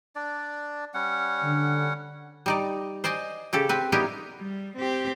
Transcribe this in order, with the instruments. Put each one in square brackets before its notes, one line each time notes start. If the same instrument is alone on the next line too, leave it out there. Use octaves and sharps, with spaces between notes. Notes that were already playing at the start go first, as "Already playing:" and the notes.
[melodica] D4 D5
G3 C#4 F#5
[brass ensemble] D3
[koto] G3 D#4 D5
C5 D5 D#5 G#5
C#3 G4 A4
C4 B4
G3 B3 D#4 E4 G4 A#4
[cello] G3
C4 G4